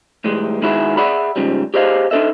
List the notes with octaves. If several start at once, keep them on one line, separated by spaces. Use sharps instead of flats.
A2 E3 G3 G#3
D#3 G#3 D4 E4 F#4 G#4
G#4 D5 E5 F#5 B5
G#2 C#3 F3 G3
G4 G#4 C5 D5 D#5 F5
D4 D#4 F4 A4 D#5 E5